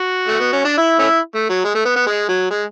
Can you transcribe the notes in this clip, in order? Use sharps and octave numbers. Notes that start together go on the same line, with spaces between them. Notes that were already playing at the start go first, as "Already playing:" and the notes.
Already playing: F#4
A3
B3
C#4
D4
E4
A3 C#4 E4
A3
F#3
G#3
A3
B3
B3
G#3
F#3
G#3